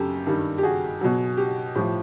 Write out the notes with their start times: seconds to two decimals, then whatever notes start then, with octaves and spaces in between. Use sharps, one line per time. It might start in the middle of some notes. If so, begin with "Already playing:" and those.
Already playing: F#2 C#3 G4 A4
0.26 G2 D#3 G3
0.58 G4
0.63 F#4 G#4
1.01 B2 F#3
1.37 G4
1.75 A2 F3 G4